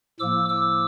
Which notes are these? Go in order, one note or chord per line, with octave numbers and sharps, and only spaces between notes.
A2 F3 A#3 D6 E6
D6 E6